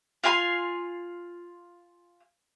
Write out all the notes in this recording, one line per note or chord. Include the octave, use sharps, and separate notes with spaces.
F4 F5 G#5 C6